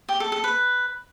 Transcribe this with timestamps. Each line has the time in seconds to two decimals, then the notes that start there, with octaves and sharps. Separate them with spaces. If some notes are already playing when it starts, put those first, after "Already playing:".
0.09 G4
0.20 A4
0.32 A4
0.44 B4